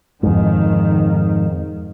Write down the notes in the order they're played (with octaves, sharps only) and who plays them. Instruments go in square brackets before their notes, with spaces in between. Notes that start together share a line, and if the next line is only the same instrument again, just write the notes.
[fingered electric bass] F2 G#2 [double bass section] D#3